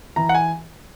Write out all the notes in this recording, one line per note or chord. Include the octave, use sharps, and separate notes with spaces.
E3 A#5
F#5
G#5